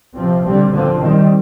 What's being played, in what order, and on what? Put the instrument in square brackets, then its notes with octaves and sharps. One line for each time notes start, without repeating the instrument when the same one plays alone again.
[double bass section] C3 F3 C4
D3 G3 C4
D3 F3 C4
D#3 G3 C4